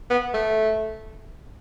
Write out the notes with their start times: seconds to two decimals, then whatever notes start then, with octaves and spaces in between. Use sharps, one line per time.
0.10 B3
0.34 A3